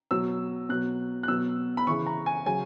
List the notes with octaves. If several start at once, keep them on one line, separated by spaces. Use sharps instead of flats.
B2 F#3 E6
B2 F#3 F#6
F#6
B2 F#3 E6
B5
C#3 E3 C#6
A#5
G#5
C#3 F#3 G#5